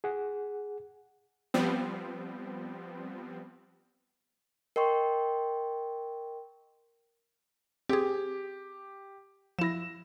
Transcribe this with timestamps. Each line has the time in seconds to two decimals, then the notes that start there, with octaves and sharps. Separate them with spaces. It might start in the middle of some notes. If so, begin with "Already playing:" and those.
0.04 G#4 F#5
1.54 F3 G3 B3 C4
4.76 A#4 D#5 G5 C6 C#6
7.89 C4 G4 G#4
9.59 F3 E4 A#6 E7